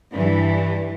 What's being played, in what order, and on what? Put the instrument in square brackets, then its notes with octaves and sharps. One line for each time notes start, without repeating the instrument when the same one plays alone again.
[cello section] G2 E3